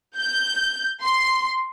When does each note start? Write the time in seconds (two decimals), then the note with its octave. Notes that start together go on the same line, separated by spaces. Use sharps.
0.17 G6
1.03 C6